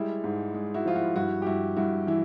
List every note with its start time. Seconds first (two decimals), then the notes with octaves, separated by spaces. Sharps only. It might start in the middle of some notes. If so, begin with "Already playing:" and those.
Already playing: G3 G#3 E4
0.24 G#2
0.54 G#3
0.74 E4 F#4
0.85 F3 F4
0.95 E4 F#4
1.16 G2 E4 F#4
1.42 G4
1.46 G2 E4 F#4
1.77 G2 E4 F#4
2.07 E3 E4